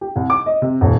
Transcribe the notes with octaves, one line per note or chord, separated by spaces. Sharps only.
G4
C2
D6
D#5
C3
D#1